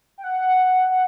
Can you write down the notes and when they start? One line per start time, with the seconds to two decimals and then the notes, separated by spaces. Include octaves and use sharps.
0.18 G5
0.24 F#5